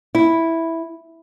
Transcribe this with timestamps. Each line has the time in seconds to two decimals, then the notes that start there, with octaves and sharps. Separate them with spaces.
0.15 E4